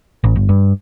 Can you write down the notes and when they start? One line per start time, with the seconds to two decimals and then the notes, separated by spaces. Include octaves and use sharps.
0.24 A1
0.36 G1
0.49 G2